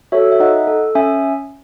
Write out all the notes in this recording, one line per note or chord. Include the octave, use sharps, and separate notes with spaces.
F#4 A4 C#5 E5
E5
D#4 D#5 F#5
A4
C#4 E5 G#5